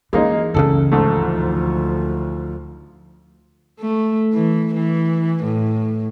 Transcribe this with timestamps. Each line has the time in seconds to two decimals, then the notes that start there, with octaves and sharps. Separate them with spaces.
0.13 E3 G#3 A#3 D#4
0.54 F#1 C#2 C#3 A4
0.92 D2 G#2 F3 A3
3.80 A3
4.33 E3
4.74 E3
5.44 A2